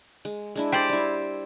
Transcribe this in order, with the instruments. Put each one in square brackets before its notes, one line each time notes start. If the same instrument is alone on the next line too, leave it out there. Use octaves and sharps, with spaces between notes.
[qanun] G#3
G#3 D4 E4
[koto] G4 C5 D5
[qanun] G3 E4